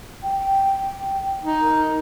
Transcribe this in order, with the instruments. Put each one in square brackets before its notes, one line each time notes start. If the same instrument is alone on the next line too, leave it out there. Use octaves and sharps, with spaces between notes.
[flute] G5
[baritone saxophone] D#4
[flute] A#4